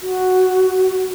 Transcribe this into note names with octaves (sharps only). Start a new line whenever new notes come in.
F#4